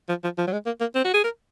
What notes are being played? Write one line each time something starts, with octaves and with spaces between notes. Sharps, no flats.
F3
F3
F3
F#3
G#3
A#3
A#3
C4
F#4
G#4
A#4